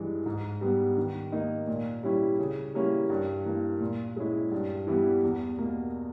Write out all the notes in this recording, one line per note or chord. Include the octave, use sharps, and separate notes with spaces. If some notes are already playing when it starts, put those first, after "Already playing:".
Already playing: G2 E3 G#3
G#2
G3 B3
D#3
A#3 D#4
A#2
G3 C#4 E4
C#3
G3 A#3 C#4 E4
G2
E3 A#3
A#2
G#3 C#4 E4
G2
E3 G3 B3 E4
E2
B2 A#3